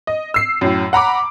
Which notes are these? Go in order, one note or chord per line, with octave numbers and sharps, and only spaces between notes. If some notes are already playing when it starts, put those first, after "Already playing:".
D#5
E6 C7
F#2 A2
F#5 A#5 B5 D6